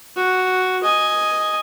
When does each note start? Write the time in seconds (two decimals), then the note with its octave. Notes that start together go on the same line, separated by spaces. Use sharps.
0.17 F#4
0.83 D#5 G#5